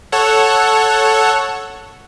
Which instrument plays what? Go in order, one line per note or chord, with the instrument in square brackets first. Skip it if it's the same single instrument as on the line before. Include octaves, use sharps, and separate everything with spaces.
[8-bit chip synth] A4 C#5 F#5